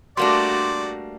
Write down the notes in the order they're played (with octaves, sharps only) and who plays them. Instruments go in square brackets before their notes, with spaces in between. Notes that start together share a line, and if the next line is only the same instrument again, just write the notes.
[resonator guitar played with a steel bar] G3 A#3 D4 [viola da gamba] A3 F#4 [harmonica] D5 [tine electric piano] C6